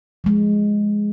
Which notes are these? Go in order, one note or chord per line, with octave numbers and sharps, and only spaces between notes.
F3 G#3